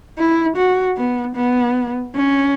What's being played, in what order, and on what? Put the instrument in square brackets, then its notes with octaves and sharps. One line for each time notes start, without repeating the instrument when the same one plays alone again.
[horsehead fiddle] E4
F#4
B3
B3
C#4